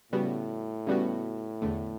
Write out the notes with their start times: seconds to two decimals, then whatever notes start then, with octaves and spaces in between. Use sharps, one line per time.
0.12 A2 C#3 G3 B3 F#4
0.87 C#3 G3 B3 F#4
1.62 E2 D3 A3